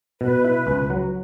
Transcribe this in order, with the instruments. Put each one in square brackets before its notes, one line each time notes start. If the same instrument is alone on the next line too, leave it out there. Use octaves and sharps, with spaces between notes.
[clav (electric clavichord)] B2 [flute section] B4
[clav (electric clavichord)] E4
C#2
F#3